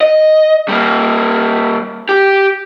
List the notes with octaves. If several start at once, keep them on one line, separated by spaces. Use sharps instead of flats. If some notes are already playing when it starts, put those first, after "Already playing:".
D#5
G3 A#3
G4